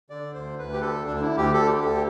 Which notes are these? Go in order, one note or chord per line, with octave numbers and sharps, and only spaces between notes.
D3 D5
D2 C5
D2 B4
G4
D3 A4
D2 D4
D4
E4
D2
G4
D3 A4
G4
D2 A4
G4